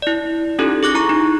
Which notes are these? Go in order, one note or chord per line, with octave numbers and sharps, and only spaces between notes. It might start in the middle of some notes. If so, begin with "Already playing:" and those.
E4 D5
C#4 D#4 F4 G4 A4
G#4 D6 F#6 A#6
E4 A#5 C#6
D#4